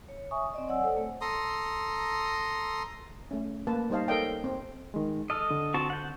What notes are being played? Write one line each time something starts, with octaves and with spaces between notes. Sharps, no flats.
C#5
E5 G#5 C#6 D#6
C4 D5 D#5
F#3 C#5 D5 F#5 G#5 E6
A4 C5 D5
A3
A4 A#5 C6 D#6
A3 C#4
A#3 B4 A5
G3 D#4 C5 D#5 F5 A5
A4 A#4 C#5 D#5 F5 G5
C4
D#3 G#3
A4 D#5 E6 F6
D3
C4 F#4 A5
F#5 G6